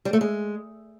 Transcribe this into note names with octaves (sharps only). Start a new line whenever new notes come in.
G3
A3
G#3